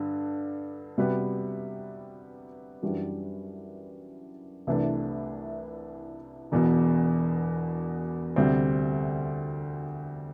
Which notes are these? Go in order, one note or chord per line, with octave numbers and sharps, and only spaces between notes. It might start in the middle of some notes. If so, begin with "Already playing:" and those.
Already playing: G2 D3
C3 G3 B3 F#4 B4
F#2 E3 G3 D4 F#4
C2 C3 E3 A3 D4
E1 E2 B2
D2 C3 G3 C4